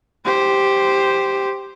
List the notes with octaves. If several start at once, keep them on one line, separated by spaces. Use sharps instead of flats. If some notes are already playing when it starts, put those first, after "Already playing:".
G4 C5